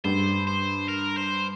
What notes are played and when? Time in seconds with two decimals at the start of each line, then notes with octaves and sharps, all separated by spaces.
0.05 G2 C5
0.47 C5
0.88 A#4
1.17 C5